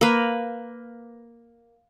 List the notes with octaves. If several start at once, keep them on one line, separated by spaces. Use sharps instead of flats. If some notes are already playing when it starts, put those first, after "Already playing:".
A#3 B4